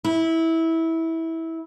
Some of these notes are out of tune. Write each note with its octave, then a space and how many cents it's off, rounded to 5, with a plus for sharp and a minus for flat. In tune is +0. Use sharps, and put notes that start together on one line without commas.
E4 -15